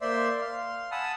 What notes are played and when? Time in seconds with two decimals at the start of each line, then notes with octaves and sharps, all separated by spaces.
0.01 A#3 C5 D5 E5 C6
0.41 F5 C6
0.91 F#5 G#5 A5 B5 D#6 E6